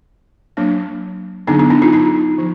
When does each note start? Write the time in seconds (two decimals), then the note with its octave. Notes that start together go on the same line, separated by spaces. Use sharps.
0.57 F#3 A#3 D4
1.47 D3 F#3 B3 D4 D#4
1.60 D#4
1.70 D4 E4
1.82 D#4 F4
1.93 D#4
2.38 F3